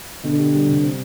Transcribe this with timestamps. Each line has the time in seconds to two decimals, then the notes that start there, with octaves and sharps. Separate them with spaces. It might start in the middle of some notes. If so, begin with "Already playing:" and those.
0.24 B2 D3
0.39 G4
0.54 G3
0.69 C3
0.83 C4